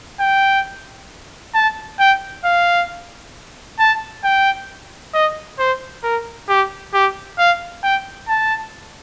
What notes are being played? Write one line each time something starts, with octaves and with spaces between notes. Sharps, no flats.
G5
A5
G5
F5
A5
G5
D#5
C5
A#4
G4
G4
F5
G5
A5